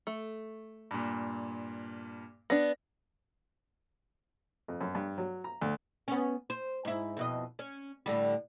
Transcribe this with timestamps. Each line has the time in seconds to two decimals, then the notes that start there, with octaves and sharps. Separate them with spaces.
0.07 A3
0.91 G2 A#2
2.50 B3 D4 A#6
4.68 F2
4.81 F#2
4.95 G2
5.18 F#3
5.44 A#5
5.62 D2
6.08 B3 C#4
6.50 C5
6.85 G#2 E4
7.17 F2 B2 D#5
7.59 C#4
8.06 A2 D3 G3